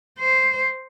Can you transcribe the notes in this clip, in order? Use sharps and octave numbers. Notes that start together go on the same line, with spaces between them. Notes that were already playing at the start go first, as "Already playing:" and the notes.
C5